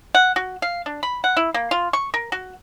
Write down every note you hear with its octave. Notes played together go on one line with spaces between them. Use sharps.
F#5
F#4
F5
D4
B5
F#5
E4
A#3
F4
C#6
A#4
F#4